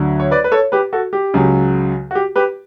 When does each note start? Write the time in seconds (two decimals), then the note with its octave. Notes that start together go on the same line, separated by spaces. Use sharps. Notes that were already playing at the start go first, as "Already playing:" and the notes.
Already playing: D2 D3 F#3
0.20 C#5
0.31 B4 D5
0.44 B4
0.52 A4 C#5
0.72 G4 B4
0.93 F#4 A4
1.13 G4
1.34 C#2 C#3 F#3
2.11 F#4
2.15 G4
2.36 G4 B4